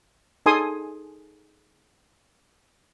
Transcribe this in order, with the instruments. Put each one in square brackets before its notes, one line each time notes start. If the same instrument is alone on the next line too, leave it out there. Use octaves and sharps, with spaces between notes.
[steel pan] D#4 G#4 A4 G#5 C6 D#6